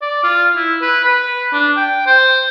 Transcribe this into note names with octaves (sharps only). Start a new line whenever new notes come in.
D5
F4
E4
B4
B4
D4
G5
C5